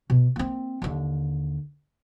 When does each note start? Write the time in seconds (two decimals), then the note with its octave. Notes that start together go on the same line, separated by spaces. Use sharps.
0.10 B2
0.36 A#3 C4
0.82 D#2 D3